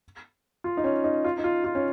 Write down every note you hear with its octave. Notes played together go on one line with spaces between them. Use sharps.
F4
D#4
C#4
D#4
F4
D#4
F4
F4
C#4